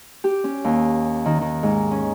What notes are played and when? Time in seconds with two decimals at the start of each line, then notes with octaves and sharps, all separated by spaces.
0.24 G4
0.44 C#4
0.64 D#2
1.26 D#3
1.41 D#3
1.63 G#2
1.91 C#4